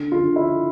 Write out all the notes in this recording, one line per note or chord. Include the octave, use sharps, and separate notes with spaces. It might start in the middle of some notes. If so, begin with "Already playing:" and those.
Already playing: D3
F4
D3
E4